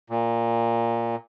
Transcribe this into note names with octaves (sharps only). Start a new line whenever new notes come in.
A#2